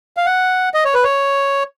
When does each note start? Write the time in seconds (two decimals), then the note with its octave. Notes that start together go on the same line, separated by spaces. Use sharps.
0.17 F5
0.26 F#5
0.74 D#5
0.85 C#5
0.94 B4
1.04 C#5